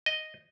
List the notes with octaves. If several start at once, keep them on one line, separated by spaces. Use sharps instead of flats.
D#5